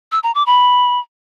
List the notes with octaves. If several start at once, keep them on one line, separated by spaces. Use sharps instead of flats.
E6
A#5
D6
B5